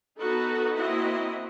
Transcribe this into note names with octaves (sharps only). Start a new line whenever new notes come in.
B3 D#4 F#4 A4 B4
A#3 C4 E4 F#4 D#5